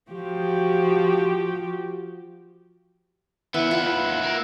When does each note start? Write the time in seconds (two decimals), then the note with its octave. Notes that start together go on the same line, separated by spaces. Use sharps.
0.11 F3 F#4 G4
3.54 E3 B3 E4 E5 F#5
3.71 D#2 F4 B4
4.23 A#3